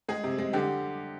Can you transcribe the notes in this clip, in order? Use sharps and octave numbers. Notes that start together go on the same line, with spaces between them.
G#3 G#4
C3
G#3
D3 G4